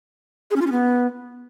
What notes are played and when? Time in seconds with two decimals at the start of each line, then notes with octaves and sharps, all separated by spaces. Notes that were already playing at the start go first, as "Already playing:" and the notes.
0.51 G#4
0.56 C#4
0.61 F4
0.66 C#4
0.72 B3